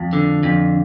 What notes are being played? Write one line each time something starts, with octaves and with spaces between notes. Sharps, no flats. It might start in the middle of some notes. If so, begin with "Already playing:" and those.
Already playing: F2
D3
F2